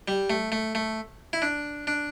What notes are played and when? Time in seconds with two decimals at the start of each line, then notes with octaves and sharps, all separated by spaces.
0.08 G3
0.30 A3
0.52 A3
0.75 A3
1.33 E4
1.42 D4
1.87 D4